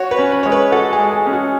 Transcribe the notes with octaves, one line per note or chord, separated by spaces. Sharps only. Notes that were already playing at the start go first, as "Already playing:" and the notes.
Already playing: F#4 C#5
B4
C#4
B4
G#3 C#5
B4
F#4 A4
G#4
G#3
G#4
C#4
F#4